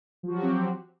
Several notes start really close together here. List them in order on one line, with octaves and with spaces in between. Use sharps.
F3 F#4 F#3 G4 C4